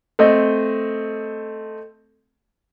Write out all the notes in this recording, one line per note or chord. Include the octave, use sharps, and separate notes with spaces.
A3 C4 D#5